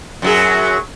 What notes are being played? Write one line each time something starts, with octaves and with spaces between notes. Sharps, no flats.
F#2 F#3 G#4